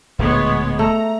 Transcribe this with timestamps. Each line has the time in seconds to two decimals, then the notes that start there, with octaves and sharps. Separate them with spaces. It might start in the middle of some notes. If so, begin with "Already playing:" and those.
0.19 D1 D2 A#2 G#3 B3 C#5
0.79 A3 A#5